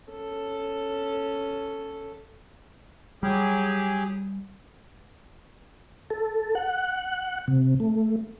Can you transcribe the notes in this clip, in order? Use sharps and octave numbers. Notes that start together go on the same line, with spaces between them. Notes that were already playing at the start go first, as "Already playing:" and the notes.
C#4 A4
F#3 G3 G4 G#4
A4
F#5
C3
A3